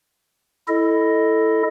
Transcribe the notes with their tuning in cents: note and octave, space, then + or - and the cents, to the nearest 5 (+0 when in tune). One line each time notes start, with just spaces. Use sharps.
E4 +0 A4 +0 D#5 +0